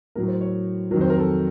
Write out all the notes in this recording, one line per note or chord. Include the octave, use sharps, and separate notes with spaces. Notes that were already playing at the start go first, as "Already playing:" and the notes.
A2 F#3 A#4
C5
C#5
F2 D#3 F#3 A#4
C5
A#4
A4